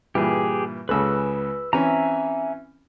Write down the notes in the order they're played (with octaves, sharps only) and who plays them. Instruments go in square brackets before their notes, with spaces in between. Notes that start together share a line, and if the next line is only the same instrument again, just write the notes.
[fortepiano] G2 A#2 E3 [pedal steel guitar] G4 G#4
[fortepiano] C#2 C#3 A4 [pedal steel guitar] B4 E6
[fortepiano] E3 C4 C#4 [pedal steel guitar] E5 G#5 A#5